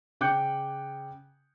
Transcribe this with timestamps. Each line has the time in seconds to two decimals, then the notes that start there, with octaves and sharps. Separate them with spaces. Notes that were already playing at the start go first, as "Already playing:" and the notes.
0.21 C#3 G5 D6 F#6 G6 C#7